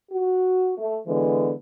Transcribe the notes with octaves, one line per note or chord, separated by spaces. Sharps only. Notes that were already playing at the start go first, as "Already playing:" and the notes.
F#4
A3
D3 E3 G#3 B3